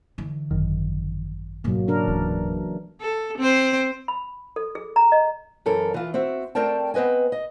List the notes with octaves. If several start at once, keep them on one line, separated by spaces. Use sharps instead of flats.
D3 E3
G#1 F#2 D#3
G#2 B2 F#3 A#3
C#3 D4 A#4
D1 E3
A4
C4 C5
B5
A4
G#4
A#5
D#5
F#2 E3 A4 A#4
E3 F4
C4 F#4 E5
A3 C4 A#4 D5 G5 A5
B3 C4 B4 D#5 G#5
D#5